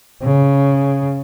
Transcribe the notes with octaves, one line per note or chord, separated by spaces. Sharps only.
C#3